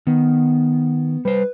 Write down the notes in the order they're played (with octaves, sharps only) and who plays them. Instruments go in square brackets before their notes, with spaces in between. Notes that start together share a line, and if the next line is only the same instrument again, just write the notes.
[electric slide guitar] D#3 [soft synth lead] B3
[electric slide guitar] G3 C5 [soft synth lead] B4